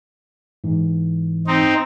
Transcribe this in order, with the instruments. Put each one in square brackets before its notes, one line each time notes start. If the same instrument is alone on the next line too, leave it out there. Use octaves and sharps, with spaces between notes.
[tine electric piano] G#2 E3
[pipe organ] C4 D#4